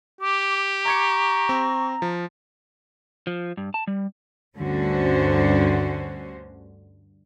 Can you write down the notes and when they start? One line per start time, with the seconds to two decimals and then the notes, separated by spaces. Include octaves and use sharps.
0.21 G4 D6
0.86 A#5 C#6 D6 G#6 C#7
1.49 C4
2.02 F3
3.27 F3
3.57 G2
3.74 A5
3.87 G3
4.56 D2 G2 D3 C#4 F#4 C5